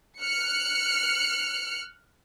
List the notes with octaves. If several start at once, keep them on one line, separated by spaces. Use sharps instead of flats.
F6 F#6 C#7